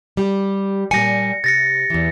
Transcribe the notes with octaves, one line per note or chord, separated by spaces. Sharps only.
G3 G4
A#2 G3 G#5 A#6 C#7
C3 A6 A#6 C#7
E2 E3